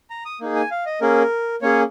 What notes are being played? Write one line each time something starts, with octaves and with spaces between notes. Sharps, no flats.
A#5
D#6
A#3 D#4 G#4
G#5
F5
D#5
A#3 C#4 G#4 A#4
A#3 C#4 G#4 C#5